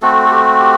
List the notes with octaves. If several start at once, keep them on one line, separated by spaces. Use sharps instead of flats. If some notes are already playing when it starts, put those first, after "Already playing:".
A3 C4 F#4 A4
A4
G4
G4